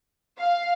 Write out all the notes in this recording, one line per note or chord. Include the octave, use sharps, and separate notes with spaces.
F5